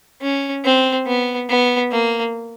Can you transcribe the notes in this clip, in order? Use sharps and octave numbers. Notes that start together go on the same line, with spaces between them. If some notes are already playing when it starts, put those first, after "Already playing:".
C#4
C4
B3
B3
A#3